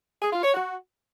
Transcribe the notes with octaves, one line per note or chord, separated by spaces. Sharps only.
G#4
F4
C#5
F#4